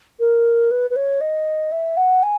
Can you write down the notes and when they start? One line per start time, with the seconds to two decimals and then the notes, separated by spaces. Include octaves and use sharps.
0.20 A#4
0.71 B4
0.90 B4
0.96 C#5
1.21 D#5
1.72 E5
1.97 F#5
2.23 G#5